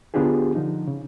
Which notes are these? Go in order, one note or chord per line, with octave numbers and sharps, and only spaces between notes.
D3 B3 D4 F4 G4 G#4
D3 F3 D#4
C#3